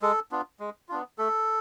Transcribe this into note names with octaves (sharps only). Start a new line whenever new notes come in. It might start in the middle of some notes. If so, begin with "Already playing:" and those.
G#3 A4
B3 D4 F4
G#3
B3 D4 F4
A3 A4